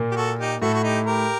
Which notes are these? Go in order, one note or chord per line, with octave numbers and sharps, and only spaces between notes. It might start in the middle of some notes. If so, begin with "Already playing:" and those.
Already playing: A#2 A#3
G4
F#4 A4
D#4 G4
A2 A3 F#4 A4
F#4
D#4 G4
G4 A#4